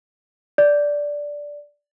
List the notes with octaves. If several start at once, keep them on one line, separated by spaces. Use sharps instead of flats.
D5